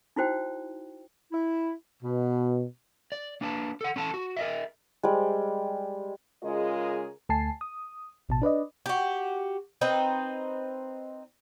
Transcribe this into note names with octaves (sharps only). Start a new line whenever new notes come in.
D#4 E4 F#4 C5 G5
E4
B2
D5
A#3 D4 B4 G#5 A5
A4 F#5
C#4 A4 A5
F#4
A#4 D#5 E5
G3 G#3
C#3 G#3 F4 G#4 A#4 D#5
D2 A3 G#5 A5 C7
D#6
A1 B2 A5
D4 B4 D5 D#5
F#4 G4
C4 D#4 B4